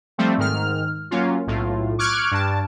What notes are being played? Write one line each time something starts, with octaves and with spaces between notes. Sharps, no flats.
F3 G3 A3 C4
G#2 D#3 F6
F#3 A#3 C#4 F4
B1 A2 F4
C#6 D6 F6 F#6 G#6 D7
G2 A5